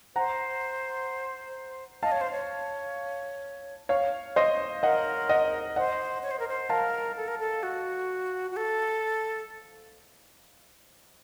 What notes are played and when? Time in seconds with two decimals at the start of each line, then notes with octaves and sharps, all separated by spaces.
0.16 C5 F#5 A#5
2.03 D#5 F5 A5
2.12 C#5
2.21 C5
2.31 C#5
3.89 C#5 F5
4.36 C5 D#5
4.83 A#4 D#5 F#5
5.29 D#5 F#5
5.76 C5 D#5 F#5
6.23 C#5
6.31 C5
6.39 A#4
6.48 C5
6.70 A#4 F5 A5
7.17 A4
7.28 A#4
7.39 A4
7.63 F#4
8.51 F#4
8.57 A4